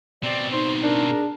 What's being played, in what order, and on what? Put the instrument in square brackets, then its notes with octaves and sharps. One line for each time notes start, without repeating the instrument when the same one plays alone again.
[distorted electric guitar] B2 C4 [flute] D5
[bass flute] D#4 [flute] C5
[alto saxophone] D4 [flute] A#4
[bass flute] G#4